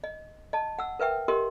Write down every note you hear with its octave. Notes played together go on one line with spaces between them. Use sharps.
D#5
D#5 A5
F#5 E6
A#4 B4 E5 G5
G4 A#4 D#5 C6